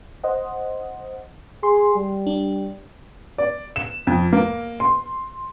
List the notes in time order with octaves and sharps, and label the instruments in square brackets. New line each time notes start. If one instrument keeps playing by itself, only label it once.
[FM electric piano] C5 D#5 F#5
[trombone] G#4 [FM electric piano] C6
[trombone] G3
[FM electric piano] D4
[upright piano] D5
E7
F2
A#3
C6